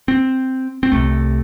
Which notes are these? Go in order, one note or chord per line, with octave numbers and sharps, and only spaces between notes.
C4
C4
C2 C3 A3